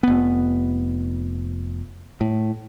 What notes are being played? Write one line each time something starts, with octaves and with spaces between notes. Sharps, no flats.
F1 B3
A2